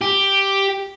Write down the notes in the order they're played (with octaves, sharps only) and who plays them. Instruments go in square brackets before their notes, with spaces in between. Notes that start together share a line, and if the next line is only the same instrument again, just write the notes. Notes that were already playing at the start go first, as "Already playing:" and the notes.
[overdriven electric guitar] G4